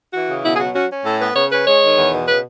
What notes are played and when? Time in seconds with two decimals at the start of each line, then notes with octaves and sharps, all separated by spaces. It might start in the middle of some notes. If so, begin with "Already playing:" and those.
0.13 E3 F#4
0.29 C#3
0.44 B2 E4
0.56 G#4
0.59 F#3 F#4
0.75 C#4 F#4
0.90 C#4
1.05 A2 A4
1.21 B3 B4
1.36 C#3 C#5
1.51 C#4 B4
1.67 G#3 C#5
1.82 D#3
1.97 E2
2.13 B2
2.27 C#3 B4